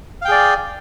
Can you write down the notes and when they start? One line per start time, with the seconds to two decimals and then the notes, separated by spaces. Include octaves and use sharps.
0.22 F5
0.25 G5
0.28 G#4
0.32 D5